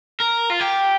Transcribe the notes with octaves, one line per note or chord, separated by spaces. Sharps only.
A#4
F4
G4